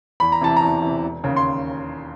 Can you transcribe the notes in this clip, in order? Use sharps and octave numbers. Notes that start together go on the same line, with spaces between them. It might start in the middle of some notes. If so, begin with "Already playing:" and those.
E2 B5
A#5
C3 E3 A5
A#5
E2
C3 E3
E1
D#2 C#3
C6